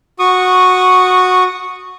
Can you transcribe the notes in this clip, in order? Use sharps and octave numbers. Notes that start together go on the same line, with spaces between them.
F#4 C#6 D#6